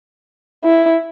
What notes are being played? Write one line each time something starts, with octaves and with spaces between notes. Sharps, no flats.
E4